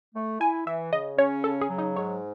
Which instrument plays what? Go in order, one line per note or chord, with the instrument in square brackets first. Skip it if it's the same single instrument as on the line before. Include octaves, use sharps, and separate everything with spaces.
[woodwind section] A3
[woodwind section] E4 [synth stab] G#5
[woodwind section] E3 [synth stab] E5
[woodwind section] C#3 [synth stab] D#5
[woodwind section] C#4 [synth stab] C#5
[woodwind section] C#3 [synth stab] A4
[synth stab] G#4
[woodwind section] F#3
[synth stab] D#4
[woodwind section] G#2 [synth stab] C#5